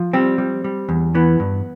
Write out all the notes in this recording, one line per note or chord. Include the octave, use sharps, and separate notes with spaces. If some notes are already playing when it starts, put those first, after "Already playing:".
Already playing: F3
G3 C4
G3
G3
E2
E3 B3
G2